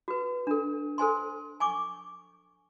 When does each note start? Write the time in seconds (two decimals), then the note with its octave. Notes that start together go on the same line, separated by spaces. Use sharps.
0.08 F#4 B4
0.47 D4 A4
0.98 A4 C5 G#5 C6
1.60 G#5 C#6 D6